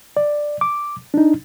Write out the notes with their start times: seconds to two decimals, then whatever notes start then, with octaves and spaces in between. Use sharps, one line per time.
0.17 D5
0.61 D6
1.14 D4 D#4